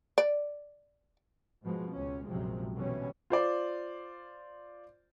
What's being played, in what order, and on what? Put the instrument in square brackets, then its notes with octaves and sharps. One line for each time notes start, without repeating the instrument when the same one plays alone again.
[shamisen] D5
[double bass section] G#2 B2 F3 G#3
C#2 C#4
A#1 F#2 C3 F3 F#3 G#3
B2 D3 E3 G3 C#4
[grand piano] F4 C5 D5